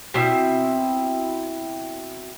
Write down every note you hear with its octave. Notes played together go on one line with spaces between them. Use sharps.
B2 C4 E4 E5